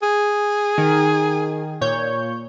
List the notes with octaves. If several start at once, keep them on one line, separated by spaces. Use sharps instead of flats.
G#4
D#3
A#2 C#5 G6